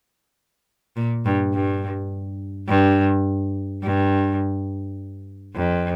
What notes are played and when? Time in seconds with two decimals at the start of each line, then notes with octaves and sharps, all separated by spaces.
0.97 A#2
1.26 G2
1.53 G2
2.69 G2
3.83 G2
5.55 F2